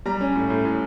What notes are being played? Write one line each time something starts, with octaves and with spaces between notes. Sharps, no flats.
G3 A#5
C#4
A2
A2
A2